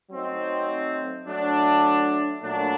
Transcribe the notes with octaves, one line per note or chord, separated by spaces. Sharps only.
F#3 A3 C4 D#4
F#3 A3 D4
A#2 F#3 A3 D4